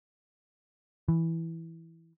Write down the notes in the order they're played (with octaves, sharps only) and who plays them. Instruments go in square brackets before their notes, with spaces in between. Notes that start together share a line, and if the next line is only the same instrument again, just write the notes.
[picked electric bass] E3